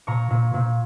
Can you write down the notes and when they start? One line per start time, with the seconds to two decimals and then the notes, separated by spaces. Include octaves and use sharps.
0.07 A#2 A#5 C#6
0.30 A#2
0.54 A#2